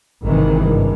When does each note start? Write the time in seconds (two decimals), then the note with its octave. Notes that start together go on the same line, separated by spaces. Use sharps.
0.24 G#1 C3 D#3 E3
0.61 G2